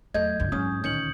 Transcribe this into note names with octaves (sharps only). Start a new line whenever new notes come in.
E2 F#3 A3 D#5 G6 G#6
A1 G2 D3
G#2 F#3 C#4 E4 D#6
D2 A#2 D#3 C#4 G6 C#7 F#7